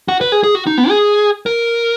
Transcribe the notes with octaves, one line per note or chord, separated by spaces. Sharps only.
F#4
B4
G#4
G#4
F#4
D#4
B3
G#4
A#4